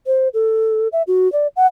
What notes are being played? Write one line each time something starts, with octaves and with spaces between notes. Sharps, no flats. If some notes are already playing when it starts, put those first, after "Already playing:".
C5
A4
E5
F#4
D5
F#5